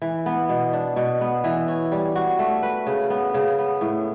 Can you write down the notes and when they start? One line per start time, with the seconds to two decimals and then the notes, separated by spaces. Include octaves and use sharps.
0.02 E3
0.26 B3
0.49 B2
0.73 D4
0.96 B2
1.21 B3
1.44 E3
1.68 C#4
1.92 G3
2.16 F#4
2.39 A3
2.63 B4
2.87 C#3
3.10 B3
3.34 C#3
3.58 B3
3.81 A2